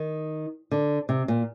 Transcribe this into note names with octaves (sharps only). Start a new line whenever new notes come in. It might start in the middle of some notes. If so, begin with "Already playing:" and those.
Already playing: D#3
D3
C3
A#2